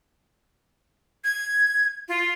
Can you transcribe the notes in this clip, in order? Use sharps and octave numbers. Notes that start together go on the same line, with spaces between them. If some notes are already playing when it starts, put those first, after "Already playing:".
G#6
F4